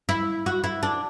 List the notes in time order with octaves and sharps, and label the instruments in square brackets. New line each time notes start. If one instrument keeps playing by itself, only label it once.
[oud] E4
F#4
E4
D4